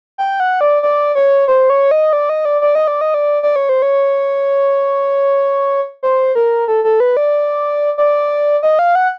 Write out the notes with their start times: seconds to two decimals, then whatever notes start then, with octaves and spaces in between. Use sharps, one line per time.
0.18 G5
0.40 F#5
0.61 D5
0.83 D5
1.15 C#5
1.48 C5
1.70 C#5
1.91 D#5
2.13 D5
2.29 D#5
2.45 D5
2.61 D5
2.75 D#5
2.88 D5
3.01 D#5
3.14 D5
3.43 D5
3.56 C#5
3.69 C5
3.82 C#5
6.03 C5
6.35 A#4
6.68 A4
6.84 A4
7.00 B4
7.17 D5
7.98 D5
8.63 D#5
8.79 F5
8.95 F#5